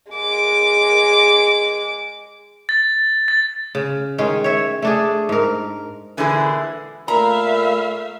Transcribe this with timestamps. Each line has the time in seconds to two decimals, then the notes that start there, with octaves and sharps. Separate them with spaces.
0.12 G#3 D6
2.69 A6
3.28 A6
3.75 C#3
4.18 D#3 G#3 C#4
4.44 C#5 E5
4.82 A3 D4 G#4
5.29 G#2 A#4
6.17 A#2 D3 E3 G#3 E4 G#4
7.08 A#2 A3 E5 F5 A#5 B5